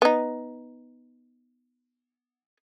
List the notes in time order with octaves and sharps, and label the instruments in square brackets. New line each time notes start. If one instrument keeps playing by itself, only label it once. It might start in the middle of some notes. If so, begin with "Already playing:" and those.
[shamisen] B3 D#4